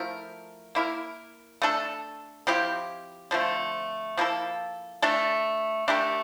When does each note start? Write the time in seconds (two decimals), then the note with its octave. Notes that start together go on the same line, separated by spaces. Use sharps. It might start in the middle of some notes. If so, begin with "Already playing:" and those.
Already playing: F3 A3 E4 A#4
0.75 A#3 E4 A#4
1.62 A3 D4 A4
2.47 F3 C4 E4 G4
3.31 D3 F3 A3 C4
4.17 F3 A#3 E4 A4
5.02 A3 D4 A4
5.88 A3 D4 G4 A#4